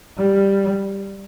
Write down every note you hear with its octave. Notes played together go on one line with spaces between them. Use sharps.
G3